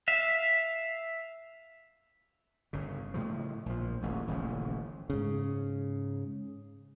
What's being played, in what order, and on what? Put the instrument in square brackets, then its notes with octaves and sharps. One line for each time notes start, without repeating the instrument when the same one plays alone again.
[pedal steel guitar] E5 F5
[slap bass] G1 C#3
A2 C#3 F3
A#1 F3
D#1 A1 E2
D#1 A1 C#3 F3
[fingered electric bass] G#2 C#3